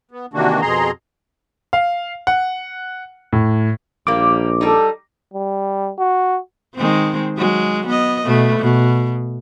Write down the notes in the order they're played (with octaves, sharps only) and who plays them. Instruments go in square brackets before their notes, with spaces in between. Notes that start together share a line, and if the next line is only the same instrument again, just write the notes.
[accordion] B3
C3 D#3 E3 A#3 D4 F#4
F2 B2 G#4 A#5 C6
[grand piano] F5
F#5
A2
[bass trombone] A#1 [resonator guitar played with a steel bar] G3 A#3 [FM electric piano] D6
[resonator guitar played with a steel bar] G3 D#4 [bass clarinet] A4
[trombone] G3
F#4
[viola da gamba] D#3 G#3 C4
F#3 G#3
B3 D#5
B2 A3
B2